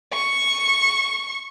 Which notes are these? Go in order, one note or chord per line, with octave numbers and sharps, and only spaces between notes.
C#6